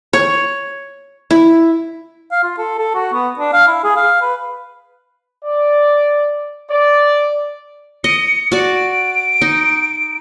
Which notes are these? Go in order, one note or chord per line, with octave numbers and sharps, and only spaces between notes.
C#5
E4
F5
F4
A4
A4
F#4
B3
D4
F5
E4
G#4
F5
B4
D5
D5
D#5 C#7
F#4 D5
D7
D#4